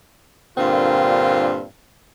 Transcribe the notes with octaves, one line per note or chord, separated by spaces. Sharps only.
G2 A#2 D3 A#3 C4 F4